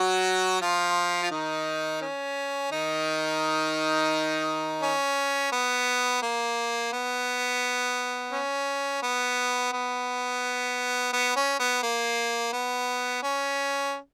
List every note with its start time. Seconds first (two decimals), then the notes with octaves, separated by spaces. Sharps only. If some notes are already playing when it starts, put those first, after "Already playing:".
Already playing: F#3 F#4
0.61 F3 F4
1.23 F4
1.31 D#3 D#4
2.01 C#4
2.72 D#3 D#4
4.82 C#4
5.52 B3
6.22 A#3
6.92 B3
8.32 C#4
9.03 B3
9.72 B3
11.13 B3
11.36 C#4
11.60 B3
11.83 A#3
12.53 B3
13.23 C#4